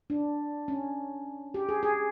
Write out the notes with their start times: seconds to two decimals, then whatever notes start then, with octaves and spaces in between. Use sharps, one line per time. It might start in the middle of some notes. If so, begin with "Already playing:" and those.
0.10 D4
0.68 C#4
1.54 G4
1.69 G#4
1.83 G#4